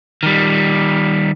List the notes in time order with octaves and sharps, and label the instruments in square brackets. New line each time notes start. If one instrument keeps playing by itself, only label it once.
[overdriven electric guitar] D#3 G3